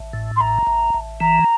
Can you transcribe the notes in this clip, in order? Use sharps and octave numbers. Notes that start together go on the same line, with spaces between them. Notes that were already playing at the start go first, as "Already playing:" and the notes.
Already playing: A1
A2
C6
A1 A#5
A1
A1
E3 A#5